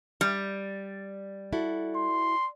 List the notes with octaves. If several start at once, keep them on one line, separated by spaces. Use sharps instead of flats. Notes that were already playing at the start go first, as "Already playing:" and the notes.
G3
E4 F#4 A4
C6